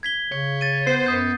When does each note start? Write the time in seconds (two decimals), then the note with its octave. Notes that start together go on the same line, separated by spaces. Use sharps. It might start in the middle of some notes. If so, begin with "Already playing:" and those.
0.03 G#6 B6 G7
0.32 C#3 C#5
0.61 A6 D#7
0.87 B3 C5 C7
1.06 F#2 D#6 G6